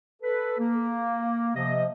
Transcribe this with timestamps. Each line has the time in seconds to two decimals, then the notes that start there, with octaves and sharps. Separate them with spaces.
0.21 A4 B4
0.59 A#3
1.55 C3 F3 D#5